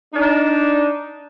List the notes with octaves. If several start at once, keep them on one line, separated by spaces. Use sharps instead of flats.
D4 D#4